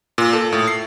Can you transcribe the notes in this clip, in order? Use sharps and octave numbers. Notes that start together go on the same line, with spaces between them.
A#2
A4
A2
C7